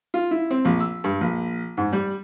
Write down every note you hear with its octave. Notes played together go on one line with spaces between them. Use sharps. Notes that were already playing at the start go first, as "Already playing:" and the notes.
F4
E4
C4
A#1
E6
G2
A#1
G#2
G3